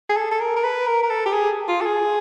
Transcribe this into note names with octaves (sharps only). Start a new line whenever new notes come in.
G#4
A4
A4
A#4
A#4
B4
A#4
A#4
A4
G4
G#4
F4
A4
G#4